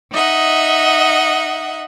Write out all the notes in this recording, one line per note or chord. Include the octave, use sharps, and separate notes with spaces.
D#4 D#5 E5 F#5